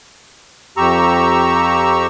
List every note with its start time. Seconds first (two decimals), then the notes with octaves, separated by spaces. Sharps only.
0.77 F2 G4 A#5 C#6 E6